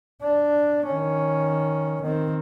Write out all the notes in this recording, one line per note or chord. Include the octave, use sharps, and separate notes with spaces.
D4
D#3 C#4
D#3 C4